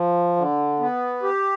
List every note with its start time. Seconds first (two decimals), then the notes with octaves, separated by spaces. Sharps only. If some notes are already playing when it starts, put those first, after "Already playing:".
Already playing: F3
0.36 D3
0.79 B3
1.23 G4